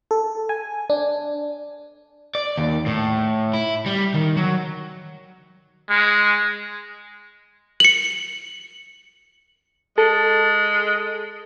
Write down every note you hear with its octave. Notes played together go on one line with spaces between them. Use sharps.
A4
G#5
D4
D5
D#2
A2
E4
G3
D#3
F#3
G#3
C#7 F#7
G#3 A4